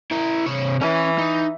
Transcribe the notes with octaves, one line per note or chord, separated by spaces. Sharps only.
E4 A#4
C3 C#5
E3 C#4
D#4